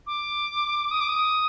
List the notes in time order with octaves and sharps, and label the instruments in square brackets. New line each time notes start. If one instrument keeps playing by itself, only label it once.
[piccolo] D6
D#6
D6
D#6